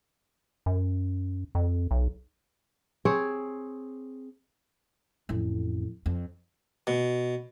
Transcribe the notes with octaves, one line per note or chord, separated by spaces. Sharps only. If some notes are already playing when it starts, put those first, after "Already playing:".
F#2
F2
B1
C4 G#4 C5 C#5
A1 F2
F2
B2